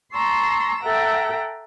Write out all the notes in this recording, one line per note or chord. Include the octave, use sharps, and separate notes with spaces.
A5 A#5 C6 C#6 E6
A4 E5 F#5 G5 A#5